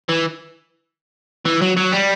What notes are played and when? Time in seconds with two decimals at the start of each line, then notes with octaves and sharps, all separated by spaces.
0.09 E3
1.46 E3
1.62 F#3
1.77 F#3
1.93 G3